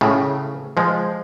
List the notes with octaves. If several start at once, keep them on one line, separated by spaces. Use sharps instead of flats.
A2 C#3
F3 G#3